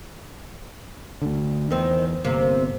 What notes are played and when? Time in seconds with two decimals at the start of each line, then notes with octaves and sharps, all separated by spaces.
1.22 D2 D3
1.71 E2 D#3 C4
2.25 G1 C3 A#3